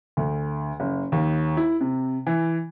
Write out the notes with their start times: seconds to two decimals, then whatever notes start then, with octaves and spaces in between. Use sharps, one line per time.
0.17 D2
0.80 F#1
1.12 D#2
1.57 E4
1.80 C3
2.26 E3